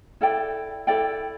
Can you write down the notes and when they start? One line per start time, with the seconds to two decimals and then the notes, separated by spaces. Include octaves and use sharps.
0.21 E4 A4 D5 G5
0.87 E4 A4 D5 G5